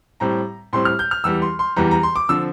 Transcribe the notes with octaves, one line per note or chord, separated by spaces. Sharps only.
A2 G3 C4 A#5
A2 G3 C4 C6
F6
G6
F6
E2 E3 G3 E6
C6
C6
E2 E3 G3 A#5
A#5
C6
D6
D3 F3 C4 E6